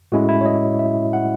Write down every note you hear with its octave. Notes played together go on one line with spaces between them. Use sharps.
A2 G#3 C#4 E4 F#4
E4
C#5
D#5
E5
F#5